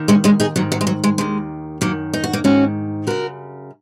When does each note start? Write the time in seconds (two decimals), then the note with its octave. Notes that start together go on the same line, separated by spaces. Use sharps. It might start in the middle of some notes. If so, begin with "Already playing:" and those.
Already playing: D#2 D#3
0.08 G#3 C#4
0.24 G#3 C#4
0.40 D#4 G#4
0.56 G#2 D#3 F#3
0.72 F#3
0.81 G#3
0.87 F#3
1.04 G#3
1.18 D#2 D#3 G#3
1.81 F#2 D#3 F#3 A#3
2.13 D#4
2.24 F#4
2.33 A#3 D#4
2.44 G#2 D#3 C#4 F#4
3.07 F#2 C#3 F#4 A#4